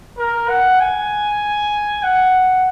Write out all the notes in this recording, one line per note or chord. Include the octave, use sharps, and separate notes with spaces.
A#4
F#5
G#5
F#5